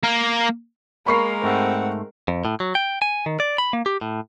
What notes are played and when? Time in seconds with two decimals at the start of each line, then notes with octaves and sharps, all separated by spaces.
0.03 A#3
1.06 G#3 A#3 A#4 B5 C#6 C7
1.44 G#2 A3 C4 F#5
2.28 F2
2.45 A2
2.60 F#3
2.75 G5
3.02 G#5
3.26 D#3
3.40 D5
3.58 B5
3.73 A#3
3.86 G4
4.01 A2